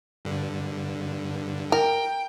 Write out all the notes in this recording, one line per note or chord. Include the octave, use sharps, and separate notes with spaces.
G2 D3
A#4 G5